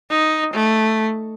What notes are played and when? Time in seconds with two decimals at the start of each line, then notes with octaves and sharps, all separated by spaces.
0.10 D#4
0.54 A3